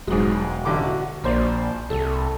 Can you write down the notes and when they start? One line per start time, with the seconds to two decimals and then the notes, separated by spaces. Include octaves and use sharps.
0.07 E1 G#2 F#3 G#3
0.65 A1 D3 D6
0.82 F#4
1.24 A#1 A#3 C5 D5
1.90 C2 A4